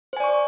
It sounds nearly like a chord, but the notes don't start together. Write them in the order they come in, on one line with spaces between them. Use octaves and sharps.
C5 G#5 D5 C#6